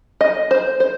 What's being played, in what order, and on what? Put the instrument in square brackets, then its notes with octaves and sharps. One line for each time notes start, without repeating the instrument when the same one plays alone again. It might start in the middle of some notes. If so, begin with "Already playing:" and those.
[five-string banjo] D#5
C5
C5